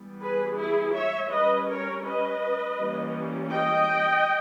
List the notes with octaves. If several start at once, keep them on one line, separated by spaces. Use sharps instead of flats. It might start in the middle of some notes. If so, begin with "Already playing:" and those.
Already playing: E3 G3 B3
G#4 B4
E4 G#4
C#5 E5
G3 C#4 B4 D#5
A#4 C#5
B4 D#5
E3 G3 A#3 C#4
D#5 G5